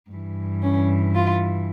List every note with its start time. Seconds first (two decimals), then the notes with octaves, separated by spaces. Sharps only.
0.11 G2 E3
0.62 C#4
1.14 F4